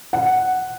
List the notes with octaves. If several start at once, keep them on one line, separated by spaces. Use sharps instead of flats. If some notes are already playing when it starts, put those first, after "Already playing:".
F#5